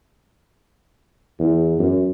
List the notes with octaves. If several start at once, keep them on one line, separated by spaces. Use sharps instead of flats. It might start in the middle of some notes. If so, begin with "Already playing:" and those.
E2
F#2